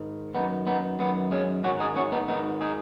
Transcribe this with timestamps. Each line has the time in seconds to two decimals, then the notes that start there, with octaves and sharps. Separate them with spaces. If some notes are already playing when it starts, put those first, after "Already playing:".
Already playing: G#2 D#3
0.35 F#2 D#3 B3 D#4
0.67 B3 D#4
0.99 F#2 D#3 B3
1.31 G#3 C#4
1.64 G#2 C#4 F#4
1.68 D#3
1.80 D#4 G#4
1.96 C#4 F#4
2.12 B3 D#4
2.28 G#2 D#3 B3 D#4
2.61 D#4 G#4